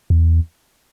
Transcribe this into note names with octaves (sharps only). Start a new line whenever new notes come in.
E2